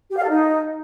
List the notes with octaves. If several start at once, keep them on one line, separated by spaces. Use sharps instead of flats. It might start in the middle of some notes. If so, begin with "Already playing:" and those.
G4
F5
A4
D#4